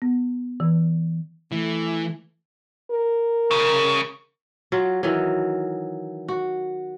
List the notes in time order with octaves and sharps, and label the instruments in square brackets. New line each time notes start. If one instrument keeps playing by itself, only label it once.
[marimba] B3
E3
[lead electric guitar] E3 [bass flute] A3
[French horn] A#4
[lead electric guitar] C2 C#3
[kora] F#3 F4
D#3 E3 F#3
F#4